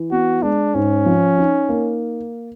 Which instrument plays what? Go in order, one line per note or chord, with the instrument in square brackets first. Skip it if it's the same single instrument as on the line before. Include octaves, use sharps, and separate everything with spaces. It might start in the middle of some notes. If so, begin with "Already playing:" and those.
Already playing: [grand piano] E3
[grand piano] B3 [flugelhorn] F#4
[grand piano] G#3 [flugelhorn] D4
[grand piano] G#2 [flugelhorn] C#4
[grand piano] F3
D#4
A#3